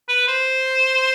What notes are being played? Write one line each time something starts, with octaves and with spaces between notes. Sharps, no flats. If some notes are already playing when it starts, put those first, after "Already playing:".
B4
C5